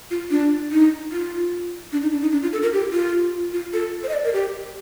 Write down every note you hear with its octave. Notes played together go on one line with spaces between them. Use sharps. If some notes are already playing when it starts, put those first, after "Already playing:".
F4
D4
D#4
F4
D4
D#4
D4
D#4
D4
F4
A4
A#4
G4
F4
F4
A4
C5
D#5
D5
A#4
G4